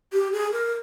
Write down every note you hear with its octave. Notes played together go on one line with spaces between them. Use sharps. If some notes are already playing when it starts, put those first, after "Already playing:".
G4
G#4
A#4